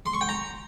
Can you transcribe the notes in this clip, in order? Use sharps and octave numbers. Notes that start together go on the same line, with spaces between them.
C6
C#6
G5
A#5